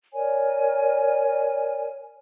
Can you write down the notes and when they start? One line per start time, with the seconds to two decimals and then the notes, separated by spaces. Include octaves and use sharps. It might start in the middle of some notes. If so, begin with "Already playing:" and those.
0.14 A#4 C#5 D5 G#5